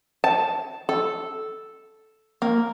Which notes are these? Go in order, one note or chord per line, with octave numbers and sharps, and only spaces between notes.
A5
A4
A#3